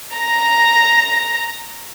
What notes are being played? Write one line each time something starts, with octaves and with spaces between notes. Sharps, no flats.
A#5 A#6